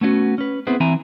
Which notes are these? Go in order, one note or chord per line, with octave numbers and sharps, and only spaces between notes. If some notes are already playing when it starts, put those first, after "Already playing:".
A3 B3 C#4 D4 F#4
C#4 B4
B3 C4 E4 G#4 B4 C5
E3 C4 E4 G#5 A#5